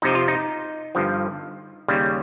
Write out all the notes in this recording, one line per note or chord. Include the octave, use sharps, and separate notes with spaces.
F2 C3 F3 D#4
F4
D#4
G1 G2 F3
D#2 C#3 G3